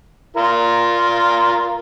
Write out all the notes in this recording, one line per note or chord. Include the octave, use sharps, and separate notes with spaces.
F4 A#4